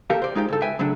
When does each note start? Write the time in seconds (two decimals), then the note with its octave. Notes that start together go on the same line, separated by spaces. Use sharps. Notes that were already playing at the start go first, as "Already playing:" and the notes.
0.10 A#2 G4 A4 A#4 F5
0.22 C5 D5
0.35 G#3 D#4 F4 G4
0.49 C#2 G2 A4
0.62 B4 E5 G5 G#5
0.79 C#3 F#3 A3 D4